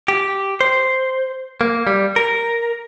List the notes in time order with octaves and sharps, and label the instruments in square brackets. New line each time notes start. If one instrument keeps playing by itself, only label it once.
[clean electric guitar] G4
C5
A#3
G3
A#4